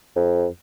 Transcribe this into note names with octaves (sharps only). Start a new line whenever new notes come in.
F2